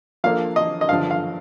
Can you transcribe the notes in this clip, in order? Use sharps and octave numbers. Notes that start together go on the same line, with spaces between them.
F3 A#3 D4 A4 F5
D#5
D#5
G2 D3 F3 F5
F5